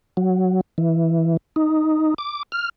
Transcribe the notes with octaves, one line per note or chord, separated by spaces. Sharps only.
F#3
E3
D#4
D6
F6